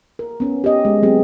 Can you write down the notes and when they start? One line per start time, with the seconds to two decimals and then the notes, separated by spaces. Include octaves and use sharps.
0.19 A#4
0.40 B3 C#4
0.64 G4 D#5
0.85 G#3
1.03 F#3 G#3 B3 C4 G4 G#4